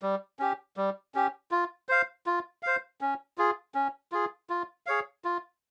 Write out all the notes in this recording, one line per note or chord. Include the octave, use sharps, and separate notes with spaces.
G3
C#4 G4
G3
C#4 G4
F4
C5 F5
F4
C5 F5
C#4
F4 G#4
C#4
F4 G#4
F4
G#4 C#5 F5
F4